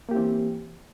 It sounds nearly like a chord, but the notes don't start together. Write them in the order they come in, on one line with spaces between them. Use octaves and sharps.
A#3 G4 E4 C4 E3